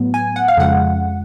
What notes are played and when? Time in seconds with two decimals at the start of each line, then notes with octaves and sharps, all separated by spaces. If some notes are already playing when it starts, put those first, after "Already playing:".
Already playing: A2 F#3 B3
0.14 G#5
0.36 F#5
0.48 F5
0.57 F2 C#3 F3 G#3 F#5